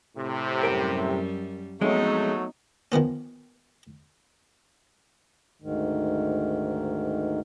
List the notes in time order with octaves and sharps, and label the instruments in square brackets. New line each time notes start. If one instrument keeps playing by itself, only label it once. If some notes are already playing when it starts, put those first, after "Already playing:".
[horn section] A2 C3
[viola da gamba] F#2 G3 [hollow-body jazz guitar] A#4 G5
[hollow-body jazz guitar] F2 G#3 C#4 [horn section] F#3 A3 [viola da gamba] B3 D#4
[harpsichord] D#3 F3 B3 C#4
[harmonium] D2 G#2 D#3